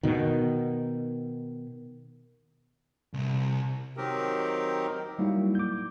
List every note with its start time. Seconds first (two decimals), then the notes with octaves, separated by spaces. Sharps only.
0.03 B2 D#3
3.14 C2
3.97 D#3 F#3 C4 D#4 G4 A#4
5.18 F#3 G3 A#3 D#4 E4 F#4
5.55 D6 G6